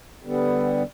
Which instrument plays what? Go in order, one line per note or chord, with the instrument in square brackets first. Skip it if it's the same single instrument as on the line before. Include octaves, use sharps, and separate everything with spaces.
[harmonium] D3 G3 B3